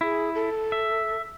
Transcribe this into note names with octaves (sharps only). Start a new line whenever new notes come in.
E4 G#4
A4
E5